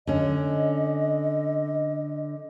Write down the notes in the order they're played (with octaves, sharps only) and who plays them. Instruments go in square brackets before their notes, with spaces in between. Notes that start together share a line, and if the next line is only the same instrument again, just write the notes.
[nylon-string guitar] D3 C#4 [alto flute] D#5